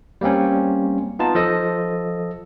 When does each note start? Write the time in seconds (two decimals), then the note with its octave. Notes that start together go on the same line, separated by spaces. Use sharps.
0.21 G3 A#3 C4 C#4
1.19 B3 D#4 F4 A5
1.35 F3 A4 D#5